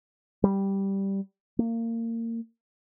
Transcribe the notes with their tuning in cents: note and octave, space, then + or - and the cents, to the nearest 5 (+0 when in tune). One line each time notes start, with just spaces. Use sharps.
G3 -5
A#3 -25